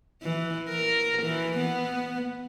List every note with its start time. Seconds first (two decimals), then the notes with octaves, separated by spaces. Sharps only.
0.23 E3
0.69 A#4
1.23 E3
1.58 B3